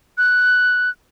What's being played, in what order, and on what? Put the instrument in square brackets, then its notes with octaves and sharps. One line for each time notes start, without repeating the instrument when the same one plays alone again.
[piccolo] F#6